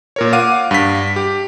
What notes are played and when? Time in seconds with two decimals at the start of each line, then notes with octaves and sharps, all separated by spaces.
0.16 A#2 A#4 C#5
0.33 F5 F#5 D6 D#7
0.71 G2 B6
1.16 G4